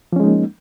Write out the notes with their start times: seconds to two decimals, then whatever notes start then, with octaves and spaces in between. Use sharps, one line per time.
0.13 F3
0.16 C#4
0.20 G#3
0.24 D#4
0.27 A#3